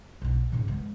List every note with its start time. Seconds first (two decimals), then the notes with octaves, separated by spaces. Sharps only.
0.22 B1 B3
0.52 G#2 C#3
0.68 G#3 B3